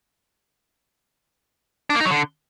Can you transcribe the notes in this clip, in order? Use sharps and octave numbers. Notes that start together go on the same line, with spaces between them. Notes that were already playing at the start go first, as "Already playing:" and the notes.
D4
A#3
D#4
F#3
D3